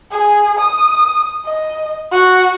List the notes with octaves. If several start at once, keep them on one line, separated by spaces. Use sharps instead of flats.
G#4
D#6
D#5
F#4